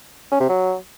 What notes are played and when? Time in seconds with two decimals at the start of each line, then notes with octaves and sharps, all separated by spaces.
0.31 C#4
0.40 C3
0.49 F#3